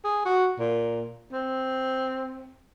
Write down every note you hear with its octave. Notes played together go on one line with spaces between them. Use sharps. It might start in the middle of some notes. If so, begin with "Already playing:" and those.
G#4
F#4
A#2
C4